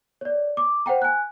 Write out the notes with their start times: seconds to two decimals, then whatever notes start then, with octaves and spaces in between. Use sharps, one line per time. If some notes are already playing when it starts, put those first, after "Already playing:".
0.21 C#5 D5
0.57 D6
0.86 C5 F#5 G5 A#5
1.02 G#5 F#6